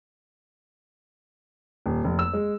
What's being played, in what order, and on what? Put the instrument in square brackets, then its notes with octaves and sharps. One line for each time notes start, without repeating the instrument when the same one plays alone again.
[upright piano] D#1
F1
E6
G#3